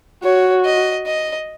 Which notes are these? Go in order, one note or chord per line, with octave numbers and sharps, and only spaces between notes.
F#4 C#5
D#5
D#5